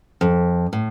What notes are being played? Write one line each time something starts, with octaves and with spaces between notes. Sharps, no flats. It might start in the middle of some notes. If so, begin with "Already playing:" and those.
F2
A2